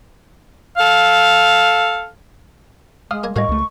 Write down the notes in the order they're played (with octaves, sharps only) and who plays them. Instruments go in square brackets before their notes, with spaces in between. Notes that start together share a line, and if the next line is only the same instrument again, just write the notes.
[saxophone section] A4 F5
[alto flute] G#3 [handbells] F5 D#6 F6
[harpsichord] A#3 D#5 G#5
[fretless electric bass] A2 [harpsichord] F#4 F5 G#5 [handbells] A#4 D#5 [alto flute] C#6
[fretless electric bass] C#2 A3